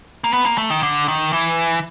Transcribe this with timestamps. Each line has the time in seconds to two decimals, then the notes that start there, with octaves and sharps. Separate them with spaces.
0.24 A#3
0.33 B3
0.46 A#3
0.58 A3
0.70 D#3
0.83 D3
1.08 D#3
1.33 E3